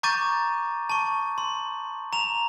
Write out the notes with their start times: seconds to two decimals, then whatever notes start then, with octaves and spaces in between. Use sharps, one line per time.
0.03 A#5 C#6 D6 G6 A6 D#7
0.89 A5 C#6
1.38 C6
2.13 A#5 F7